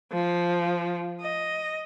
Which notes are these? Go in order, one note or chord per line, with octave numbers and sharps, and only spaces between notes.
F3
D#5